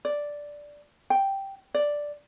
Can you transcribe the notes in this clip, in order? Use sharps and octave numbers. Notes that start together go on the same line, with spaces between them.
D5
G5
D5